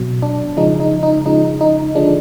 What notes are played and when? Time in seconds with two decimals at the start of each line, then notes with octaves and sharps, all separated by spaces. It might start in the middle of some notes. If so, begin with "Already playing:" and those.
Already playing: B2 F#3
0.22 D4
0.57 C#3 F3 G#3 D#4
0.80 D#4
1.03 D#4
1.26 C#3 F3 G#3 D#4
1.61 D#4
1.95 D3 F3 G#3 D4